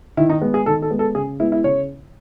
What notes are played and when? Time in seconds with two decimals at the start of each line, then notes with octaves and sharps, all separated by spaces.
0.17 D#3 E4
0.30 D#4
0.42 G#3 B3
0.54 G#4
0.66 D#3 A4
0.82 A4
0.91 G#3 B3
0.99 A4
1.15 C#3 G#4
1.40 G#3 B3 E4
1.52 E4
1.64 C#3 C#5